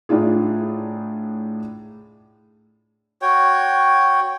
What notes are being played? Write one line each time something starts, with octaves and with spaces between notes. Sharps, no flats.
A2 D4 D#4 F4 G#4
F#4 C#5 G5